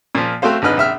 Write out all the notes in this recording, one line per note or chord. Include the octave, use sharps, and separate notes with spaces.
A#2 F3
A3 C4 F#4 C5 F5
G#1 D3 D#4 B4 F6
A#1 E5 F6